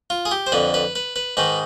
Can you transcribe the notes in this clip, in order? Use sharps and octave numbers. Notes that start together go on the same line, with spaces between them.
F4
G#4
G4
C5
F2 D3 B4
B4
B4
B4
G#2 D#3 B4